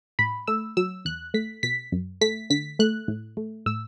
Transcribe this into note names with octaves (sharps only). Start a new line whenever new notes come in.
A2 B5
A3 E6
F#3 E6
E2 F#6
A3 B6
B2 B6
F#2
A3 B6
D3 B6
A3 F#6
A2
A3
A2 E6